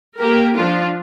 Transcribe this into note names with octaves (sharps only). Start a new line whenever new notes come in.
A#3 G4 A#4
F3 D4 F4